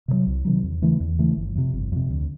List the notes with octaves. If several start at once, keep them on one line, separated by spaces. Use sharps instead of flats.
C3 D#3 F#3
C2
C3 D#3 F#3
E2
C#3 E3 A3
E2
C#3 E3 A3
G1
F2 C3
G1
F2 C3
D2